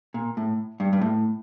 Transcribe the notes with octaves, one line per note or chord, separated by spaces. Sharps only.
A#2
A2
G2
G2
A2